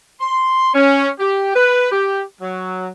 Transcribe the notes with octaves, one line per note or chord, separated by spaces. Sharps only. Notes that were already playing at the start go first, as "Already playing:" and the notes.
C6
C#4
G4
B4
G4
F#3